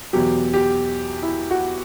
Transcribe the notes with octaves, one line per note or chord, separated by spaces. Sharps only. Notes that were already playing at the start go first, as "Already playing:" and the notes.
E2 B2 F#3 G4
G4
E4
F#4